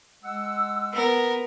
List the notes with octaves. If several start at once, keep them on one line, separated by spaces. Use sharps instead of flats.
G#3 F#5 E6
B3 A#4